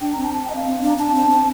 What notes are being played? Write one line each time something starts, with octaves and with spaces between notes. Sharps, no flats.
D4 G5
C4 A#5
A5
A5
G5
D#5
F5
C4
D4
A#5
D4 A5
C4
C4